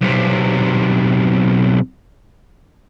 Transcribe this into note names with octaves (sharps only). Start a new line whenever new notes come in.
B1 C3